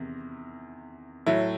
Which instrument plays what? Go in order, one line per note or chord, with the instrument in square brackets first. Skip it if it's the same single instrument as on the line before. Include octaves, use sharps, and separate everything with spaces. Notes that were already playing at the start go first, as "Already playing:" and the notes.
Already playing: [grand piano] E2 C3 D#3
A2 F#3 E4